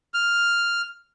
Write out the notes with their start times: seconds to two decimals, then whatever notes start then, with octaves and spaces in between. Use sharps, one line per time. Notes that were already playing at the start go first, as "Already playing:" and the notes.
0.14 F6